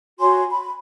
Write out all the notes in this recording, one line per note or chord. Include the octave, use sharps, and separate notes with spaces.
F#4 C#5 G#5 C6
B5